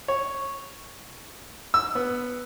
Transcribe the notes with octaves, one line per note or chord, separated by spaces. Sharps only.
C#5
E6
B3